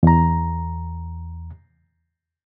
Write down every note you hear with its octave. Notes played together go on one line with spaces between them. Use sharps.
E2 A#5